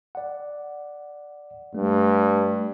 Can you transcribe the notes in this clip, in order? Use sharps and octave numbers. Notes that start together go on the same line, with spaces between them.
D5 F#5
G2 A3